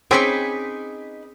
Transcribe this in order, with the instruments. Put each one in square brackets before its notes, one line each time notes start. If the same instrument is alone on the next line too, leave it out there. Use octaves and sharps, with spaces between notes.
[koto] C4 C#4 [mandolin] D#4 B4 D6 [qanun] G#4